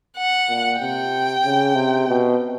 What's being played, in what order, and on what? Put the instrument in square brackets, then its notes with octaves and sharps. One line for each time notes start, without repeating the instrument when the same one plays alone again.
[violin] F#5
[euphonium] A#2
[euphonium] C3 [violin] G5
[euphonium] C#3
C3
B2